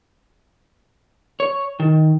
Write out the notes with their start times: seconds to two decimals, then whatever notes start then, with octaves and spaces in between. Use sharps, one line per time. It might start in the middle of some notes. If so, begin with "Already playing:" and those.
1.40 C#5
1.80 D#3